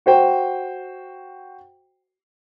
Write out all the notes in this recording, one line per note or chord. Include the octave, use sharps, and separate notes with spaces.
F#4 C5 G5